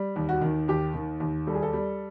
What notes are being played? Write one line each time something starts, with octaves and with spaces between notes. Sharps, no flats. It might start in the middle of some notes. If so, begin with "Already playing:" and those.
Already playing: G3
D#2
F#4
D#3
D#2 G4
D#3
D#2
G3 A4
G#4
A4
G3